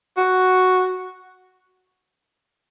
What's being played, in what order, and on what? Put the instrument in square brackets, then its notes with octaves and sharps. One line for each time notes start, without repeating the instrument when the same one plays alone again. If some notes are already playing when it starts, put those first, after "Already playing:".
[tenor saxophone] F#4